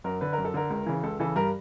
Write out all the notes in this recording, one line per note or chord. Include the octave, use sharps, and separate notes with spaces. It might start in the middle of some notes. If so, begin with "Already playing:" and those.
F#2 A#4
D3 B4
A#4
F#2
A4
D3 A#4
C#2
C#3 E3
C#2 A4
C#3 E3 A4
G2 A#4